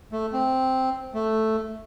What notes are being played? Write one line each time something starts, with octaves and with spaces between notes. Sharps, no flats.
A3
C4
A3